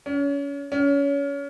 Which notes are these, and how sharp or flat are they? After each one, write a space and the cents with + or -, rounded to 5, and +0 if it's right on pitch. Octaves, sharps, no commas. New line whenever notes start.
C#4 +30
C#4 +25